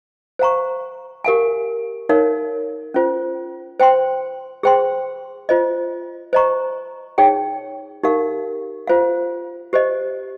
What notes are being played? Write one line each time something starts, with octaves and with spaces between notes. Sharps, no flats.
C5 F5 A#5 C#6
G4 A#4 F5 G#5
D#4 A#4 C#5 F5
C#4 F4 C5
C5 G5 C6
G#4 C5 G5 C6
F4 C5 D#5
C5 D#5 A#5 C#6
D#4 G#4 C#5 G5
D#4 G4 A#4 F5
F4 C5 F5
G4 C5 D#5